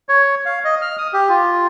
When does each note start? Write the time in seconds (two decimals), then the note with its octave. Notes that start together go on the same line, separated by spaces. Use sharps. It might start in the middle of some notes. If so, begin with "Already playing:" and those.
0.09 C#5
0.46 F5
0.64 D#5
0.82 F6
0.98 D#6
1.13 G4
1.29 F4